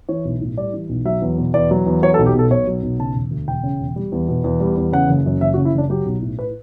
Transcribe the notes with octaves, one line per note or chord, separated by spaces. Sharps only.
E3 C#5
B1
A2
G3 D5
E3
B1
F#3 E5
E2
B2
E2 D5
F#3
E2
F#3 C#5
A4
B1
G4
B2 A4
B1 C#5
F#3
B1
C#3 A5
E1
D2
E1 G5
C#3
E1
G3
E2
B2
E2
G3
E2
C#3 F#5
F#1
F#2
F#1 E5
F#4
C#3
E4
F#1 D4
F#3 G4
B1
A2
B4